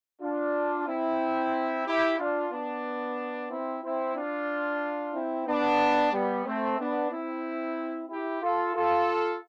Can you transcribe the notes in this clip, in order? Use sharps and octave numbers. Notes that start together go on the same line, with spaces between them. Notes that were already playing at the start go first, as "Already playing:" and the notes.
D4 F4
C4 E4
E4 G4
D4 F4
B3 D4
C4 E4
C4 E4
D4 F4
C4 E4
B3 D4
G3 B3
A3 C4
B3 D4
C4 E4
E4 G4
F4 A4
F4 A4